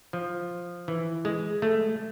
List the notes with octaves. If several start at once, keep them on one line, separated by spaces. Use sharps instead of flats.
F3
E3
G#3
A3